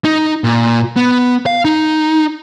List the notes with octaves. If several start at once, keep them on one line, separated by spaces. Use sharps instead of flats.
D#4
A#2
B3
F5
D#4